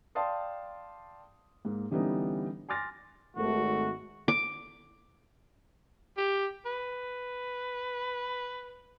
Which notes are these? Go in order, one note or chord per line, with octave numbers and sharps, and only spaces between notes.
D5 F5 G5 A5 C6 D#6
G#2 A#3
D3 E3 G3 B3 C#4 D#4
G#5 C6 D6 F6 A6 A#6
G#1 A3 F#4
D6
G4
B4